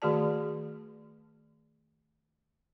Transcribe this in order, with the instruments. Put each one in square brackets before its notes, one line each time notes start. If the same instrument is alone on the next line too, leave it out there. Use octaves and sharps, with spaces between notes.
[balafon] D#3 A3 F#4 G#4 D5 A5